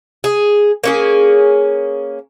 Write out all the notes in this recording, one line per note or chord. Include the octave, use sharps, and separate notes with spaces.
G#4
A#3 C#4 G#4